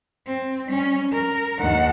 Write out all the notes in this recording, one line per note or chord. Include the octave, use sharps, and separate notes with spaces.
C4
G3 C#4
A#4
D#2 F#5